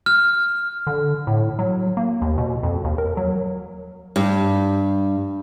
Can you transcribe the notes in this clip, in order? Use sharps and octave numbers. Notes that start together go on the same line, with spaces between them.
F6
D3
A2
F#3
A#3
D#2
B2
F2
D#2
A#4
F#3
G2